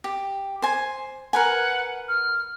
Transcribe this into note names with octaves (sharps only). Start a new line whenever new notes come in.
G4
C5 G#5
A#4 B4 F#5 G#5
F6